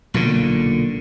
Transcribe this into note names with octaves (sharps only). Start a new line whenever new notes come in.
B1 A#2 D3